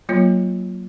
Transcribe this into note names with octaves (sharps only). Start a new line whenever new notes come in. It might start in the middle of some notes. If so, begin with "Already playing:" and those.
F#3 A#3 F4 C#5